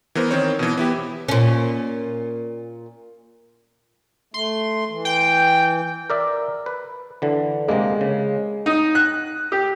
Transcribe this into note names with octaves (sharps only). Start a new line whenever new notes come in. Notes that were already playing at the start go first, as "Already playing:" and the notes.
E3 B3 A#4 C5
D#3 C4 C#5
B2 E3
B3 E4 G4
A#2 C#4
A3 C6
E3
G5
A#4 D5 E5
B4
D3 E3
C3 G#3 A#3
C#3
D#4
F#6
G4